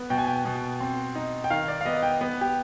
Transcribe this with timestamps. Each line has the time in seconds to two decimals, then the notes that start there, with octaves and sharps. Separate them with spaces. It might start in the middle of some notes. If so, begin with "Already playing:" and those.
Already playing: B3
0.10 B2 G5
0.18 G#5
0.27 G5
0.45 B2
0.80 C4
1.15 D#4
1.44 G5
1.50 D#3 F5
1.68 D5
1.81 F5
1.85 B3 D#5
2.03 G5
2.21 B3
2.41 G4